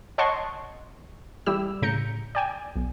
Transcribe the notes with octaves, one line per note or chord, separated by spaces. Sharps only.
C#5 D#5 F#5 A5 C6 C#6
E3 G3 G4 E6
A2 C#3 A#5 G6 C#7
D5 G5 G#5
B1